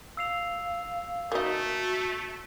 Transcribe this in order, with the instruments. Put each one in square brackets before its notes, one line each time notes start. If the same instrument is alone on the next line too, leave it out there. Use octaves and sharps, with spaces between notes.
[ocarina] F5 [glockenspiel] E6 C7 F7
[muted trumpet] A3 [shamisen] A#3 D#4 [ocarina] F#4